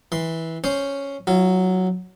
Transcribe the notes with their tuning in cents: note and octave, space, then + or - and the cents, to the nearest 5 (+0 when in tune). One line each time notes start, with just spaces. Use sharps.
E3 -15 C6 +0
C#4 +0 C5 +0 C6 +0
F#3 +0 F4 -45